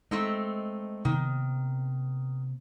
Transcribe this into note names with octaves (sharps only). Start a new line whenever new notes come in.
G#3 A3 C4 D#4
C3 D#3 A#3 B3